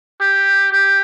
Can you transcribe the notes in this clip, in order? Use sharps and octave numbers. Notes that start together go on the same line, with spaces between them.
G4
G4